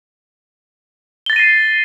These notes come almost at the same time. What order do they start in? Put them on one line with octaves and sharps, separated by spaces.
G7 A6 A#6 D#7 C7